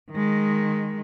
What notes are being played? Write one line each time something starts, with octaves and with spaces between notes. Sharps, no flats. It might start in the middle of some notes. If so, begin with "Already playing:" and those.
D#3 G#3